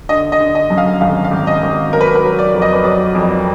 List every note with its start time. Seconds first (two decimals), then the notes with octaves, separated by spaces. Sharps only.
0.09 D3 D#5
0.32 D#5
0.40 D3
0.55 D#5
0.70 F#2
0.78 F5
1.01 G#1 F5
1.24 F5
1.31 G#1
1.47 D#5
1.63 G#1
1.93 F#3 A#4
2.01 B4
2.07 A#4
2.15 B4
2.24 F#3
2.39 D5
2.54 F2
2.62 D#5
2.73 B4
2.84 F#3 D5
3.15 F2